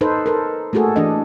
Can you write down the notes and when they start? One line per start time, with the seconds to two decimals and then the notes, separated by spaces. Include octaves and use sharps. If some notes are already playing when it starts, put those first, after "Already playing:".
0.01 D#4 A4 B4 C5
0.26 A4 A#4
0.73 A3 A#3 F#4 G#4 A4
0.96 E3 D4 D#5